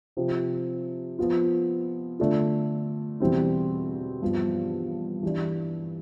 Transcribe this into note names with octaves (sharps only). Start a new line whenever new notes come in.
C3 F3 C4
F3 B3 F4
D3 A3 D4 F4 A4
E2 B2 G3 C4 E4
G2 F3 B3
E3 G3 D4